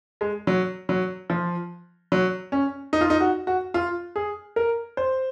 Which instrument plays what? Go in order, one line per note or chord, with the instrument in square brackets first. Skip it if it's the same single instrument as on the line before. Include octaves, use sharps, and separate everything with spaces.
[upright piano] G#3
F#3
F#3
F3
F#3
C#4
D#4
F4
D#4
F#4
F#4
F4
G#4
A#4
C5